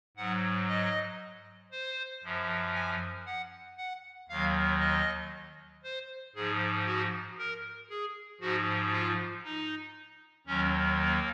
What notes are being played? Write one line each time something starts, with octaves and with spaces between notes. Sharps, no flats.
G#2 F#3 F#5
D#5
C5
F#2 F3
G#5
F#5
F#5
D#2 D#3 F#3 F5
D#5
C5
G#2 F3 G#4
F#4
A#4
G#4
G#2 F3 F#4
F4
D#4
D#2 D#3 F#3 C#4
A#3